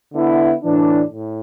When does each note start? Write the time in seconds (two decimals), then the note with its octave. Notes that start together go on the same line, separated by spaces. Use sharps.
0.13 D3 B3 E4
0.63 A2 E3 D4
1.12 A2